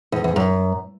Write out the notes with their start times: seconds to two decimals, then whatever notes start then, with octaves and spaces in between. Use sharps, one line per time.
0.12 E2
0.24 E2
0.36 F#2